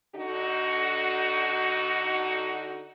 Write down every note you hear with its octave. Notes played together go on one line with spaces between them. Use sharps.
D3 D#4 F#4